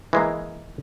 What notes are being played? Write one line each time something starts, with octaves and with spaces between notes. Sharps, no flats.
E3 G#3 A#3